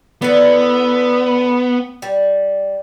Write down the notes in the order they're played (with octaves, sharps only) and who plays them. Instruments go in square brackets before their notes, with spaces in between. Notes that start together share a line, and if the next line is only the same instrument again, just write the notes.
[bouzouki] D3 E4 [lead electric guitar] B3
[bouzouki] G3